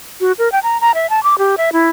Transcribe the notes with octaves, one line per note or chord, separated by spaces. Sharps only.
F#4
A#4
G5
A#5
A#5
E5
A5
D6
G4
E5
E4